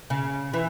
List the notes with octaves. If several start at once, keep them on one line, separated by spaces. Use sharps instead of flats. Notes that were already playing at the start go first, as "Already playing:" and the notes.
C#3
E3